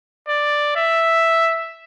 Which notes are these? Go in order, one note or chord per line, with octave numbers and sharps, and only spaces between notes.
D5
E5